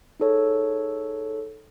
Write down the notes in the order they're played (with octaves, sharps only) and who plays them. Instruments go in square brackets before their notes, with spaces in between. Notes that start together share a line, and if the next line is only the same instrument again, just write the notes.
[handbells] D#4 G#4 A4 C#5